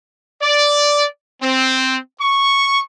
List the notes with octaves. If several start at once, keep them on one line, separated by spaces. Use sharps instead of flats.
D5
C4
C#6